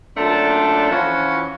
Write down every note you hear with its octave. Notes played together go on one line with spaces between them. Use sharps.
F#2 A#2 A3 D4 A5 C6
E3 F3 C#4 F4 F#4